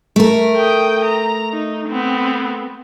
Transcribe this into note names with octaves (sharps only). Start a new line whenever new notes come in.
A3 A#4
G5 D#6
A#5
D#4
B3 C4